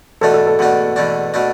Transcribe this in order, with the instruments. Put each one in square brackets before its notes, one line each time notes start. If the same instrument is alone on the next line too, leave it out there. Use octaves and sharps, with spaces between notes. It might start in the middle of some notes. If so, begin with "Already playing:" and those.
[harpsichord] E2 B2 A3 D4 [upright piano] A4
[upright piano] A4
A4
[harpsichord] E2 B2 A3 D4 [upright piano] F#5
[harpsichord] E2 B2 A3 D4
B2 A3 D4